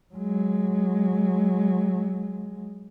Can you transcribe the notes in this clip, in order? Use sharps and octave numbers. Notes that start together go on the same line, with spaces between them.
F#3 G#3